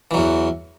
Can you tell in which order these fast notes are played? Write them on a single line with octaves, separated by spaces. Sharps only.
E3 F#3 E2